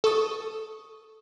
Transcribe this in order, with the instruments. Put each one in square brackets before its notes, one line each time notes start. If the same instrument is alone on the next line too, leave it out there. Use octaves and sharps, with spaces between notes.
[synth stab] A4 C#6 D#6